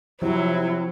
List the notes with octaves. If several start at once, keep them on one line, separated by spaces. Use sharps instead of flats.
C3 F3 F#3 E4